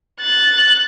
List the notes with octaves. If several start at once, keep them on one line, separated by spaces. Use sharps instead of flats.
F#6 A6